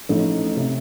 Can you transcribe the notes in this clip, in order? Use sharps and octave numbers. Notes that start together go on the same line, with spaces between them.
A1 A2 F3 A3 D#4
C3